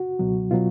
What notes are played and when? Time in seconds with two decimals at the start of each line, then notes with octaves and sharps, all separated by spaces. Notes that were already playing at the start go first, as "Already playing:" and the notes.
Already playing: F#4
0.19 C#2 B2 F#3
0.51 B2 F#3 F4